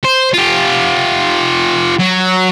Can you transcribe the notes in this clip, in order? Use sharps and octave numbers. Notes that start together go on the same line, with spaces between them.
C5
F4 G4
F#3